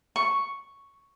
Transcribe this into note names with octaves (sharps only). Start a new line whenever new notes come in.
C#6